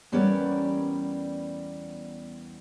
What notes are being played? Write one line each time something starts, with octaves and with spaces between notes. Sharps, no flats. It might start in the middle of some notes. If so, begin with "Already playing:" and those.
E2 G3 B3 C#4 A#4 D5